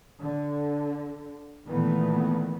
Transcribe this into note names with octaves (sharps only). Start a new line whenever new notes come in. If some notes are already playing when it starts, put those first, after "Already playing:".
D3
A#2 D#3 E3 A3 B3